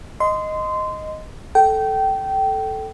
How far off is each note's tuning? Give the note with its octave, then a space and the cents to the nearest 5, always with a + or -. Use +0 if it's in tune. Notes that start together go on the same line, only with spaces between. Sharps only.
D#5 +0 C6 -20
A4 -5 G5 -20